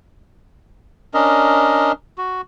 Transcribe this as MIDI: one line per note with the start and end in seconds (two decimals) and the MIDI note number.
1.14 1.92 61
1.14 1.92 62
1.14 1.92 70
1.14 1.92 75
2.18 2.41 66